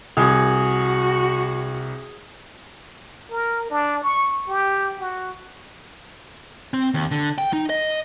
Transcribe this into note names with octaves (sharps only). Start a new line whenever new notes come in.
C2 F#4 G#4
A#4
D4
C#6
G4
F#4
C4
D#2
D3
G5
D#4
D#5